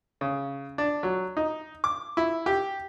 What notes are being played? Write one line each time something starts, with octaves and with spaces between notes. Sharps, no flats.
C#3
D4
F#3
D#4
D6
E4
G4